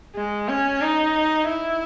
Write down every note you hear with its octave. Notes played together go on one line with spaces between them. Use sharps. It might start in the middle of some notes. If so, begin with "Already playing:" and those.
G#3
C#4
D#4
E4